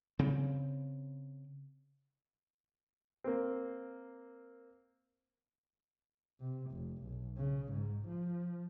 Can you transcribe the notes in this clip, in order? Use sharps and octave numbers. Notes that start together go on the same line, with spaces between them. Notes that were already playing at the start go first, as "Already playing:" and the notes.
C#3 C4
A#3 C4
C3
F1
B1
C#3
G#2
F3